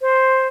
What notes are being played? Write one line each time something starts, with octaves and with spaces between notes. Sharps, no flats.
C5